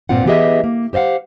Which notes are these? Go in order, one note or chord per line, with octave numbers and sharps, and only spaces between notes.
G2 A#2 A#3 C4 F4 F#5
E3 B3 G4 G#4 D#5 E5
A#3
G4 C5 D#5 F5 F#5